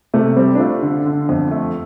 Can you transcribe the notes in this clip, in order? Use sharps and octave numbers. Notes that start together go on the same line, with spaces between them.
C3 A3
G3 C4
D4
A3 F4
D3
D3
F2
A3